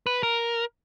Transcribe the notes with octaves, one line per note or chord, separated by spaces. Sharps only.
B4
A#4